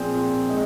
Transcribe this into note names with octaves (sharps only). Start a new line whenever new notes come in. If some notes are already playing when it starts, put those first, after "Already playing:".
Already playing: A#2 F3 C4 G#4
G#3 D#4